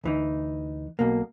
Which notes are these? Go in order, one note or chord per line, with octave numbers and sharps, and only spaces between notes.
D2 E3 D#4
B1 B2 A#3